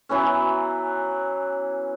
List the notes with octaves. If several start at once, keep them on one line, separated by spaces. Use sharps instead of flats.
E3 F#3 B3 C#4